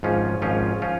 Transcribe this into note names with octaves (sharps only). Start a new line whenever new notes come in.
G#1 G#2 F3 C#4 F4
G#1 G#2 F3 C#4 F4
F3 C#4 F4